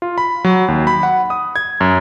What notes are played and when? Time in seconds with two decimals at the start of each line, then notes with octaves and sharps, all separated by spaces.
0.02 F4
0.18 B5
0.44 F#3
0.68 D#2
0.87 B5
1.03 F#5
1.30 D#6
1.56 G#6
1.81 F#2